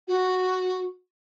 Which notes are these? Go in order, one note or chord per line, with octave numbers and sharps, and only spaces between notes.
F#4